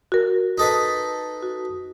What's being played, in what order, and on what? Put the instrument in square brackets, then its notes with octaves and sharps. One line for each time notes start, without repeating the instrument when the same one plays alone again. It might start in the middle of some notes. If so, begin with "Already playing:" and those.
[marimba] F#4 A#4
[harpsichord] D#4 A4 B4
[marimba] F#4